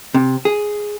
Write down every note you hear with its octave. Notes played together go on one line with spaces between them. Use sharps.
C3
G#4